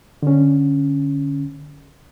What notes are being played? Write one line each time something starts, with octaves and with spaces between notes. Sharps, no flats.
D3 C#4